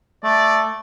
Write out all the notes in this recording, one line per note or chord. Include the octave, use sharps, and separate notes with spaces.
A3 D5